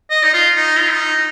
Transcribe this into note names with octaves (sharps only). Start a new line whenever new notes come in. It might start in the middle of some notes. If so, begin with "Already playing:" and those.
D#5
D#4
F4
D#4
F4
D#4